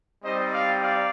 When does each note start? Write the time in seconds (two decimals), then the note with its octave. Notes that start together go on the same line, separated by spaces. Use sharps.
0.23 G3 C4 D#4 G4 C5 D#5
0.52 D5 F5
0.81 D5 F5